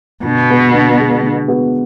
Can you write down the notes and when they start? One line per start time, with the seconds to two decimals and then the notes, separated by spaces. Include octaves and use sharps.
0.24 B2 D3
0.50 G#3 B3 F#4
0.74 D3
0.98 G#3 B3 F#4
1.23 D3
1.48 G#3 B3 F#4